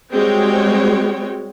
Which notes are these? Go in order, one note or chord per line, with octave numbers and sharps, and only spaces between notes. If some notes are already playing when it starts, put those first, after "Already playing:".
G3 G#3 C4 F#4 C#5 G5